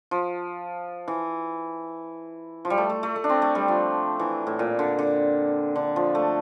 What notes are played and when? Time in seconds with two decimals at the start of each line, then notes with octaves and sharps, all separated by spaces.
0.11 F3
1.08 E3
2.65 F3
2.70 G3
2.78 A3
2.90 A3
3.03 A3
3.16 A3
3.24 D4
3.30 C4
3.42 A3
3.55 G3
3.68 F3
4.19 E3
4.47 A2
4.59 A#2
4.79 D3
4.99 D3
5.76 D3
5.96 F3
6.15 A3